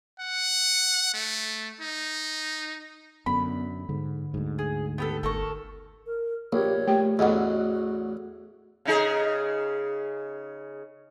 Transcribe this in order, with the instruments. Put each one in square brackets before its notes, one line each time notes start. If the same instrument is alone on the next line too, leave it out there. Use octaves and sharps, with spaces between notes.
[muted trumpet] F#5
A3
D#4
[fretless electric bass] F#2 D3 [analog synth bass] B3 [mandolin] B5
[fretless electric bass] G#2 [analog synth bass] D3
[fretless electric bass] D2 G#2
[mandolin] G#4
B3 G4 A4
[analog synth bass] G1 [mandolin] A4 A#4 C#6
[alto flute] A#4
[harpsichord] A#1 [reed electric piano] A#3 G4 [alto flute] C#5
[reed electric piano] A3 [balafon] G4 G5
[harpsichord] A1 E2 [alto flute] F#4 [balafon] D#5 F#5
[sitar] C#3 D#4 G#4